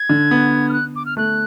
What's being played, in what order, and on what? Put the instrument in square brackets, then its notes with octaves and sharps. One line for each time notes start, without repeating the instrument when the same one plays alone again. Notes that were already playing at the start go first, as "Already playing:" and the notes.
Already playing: [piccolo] G#6
[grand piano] D3
B3
[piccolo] F6
F#6
D6
F6
[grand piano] A3 [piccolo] F#6